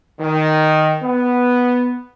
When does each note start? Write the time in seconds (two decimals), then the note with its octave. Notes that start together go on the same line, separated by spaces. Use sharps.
0.19 D#3
1.02 B3